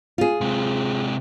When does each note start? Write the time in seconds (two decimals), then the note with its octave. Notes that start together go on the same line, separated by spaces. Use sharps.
0.18 F4 G#4
0.41 C3 G#3